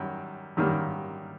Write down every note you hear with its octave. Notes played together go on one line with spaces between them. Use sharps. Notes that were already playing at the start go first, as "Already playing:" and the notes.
Already playing: F#2 D#3 G3
F#2 D#3 G3 A#3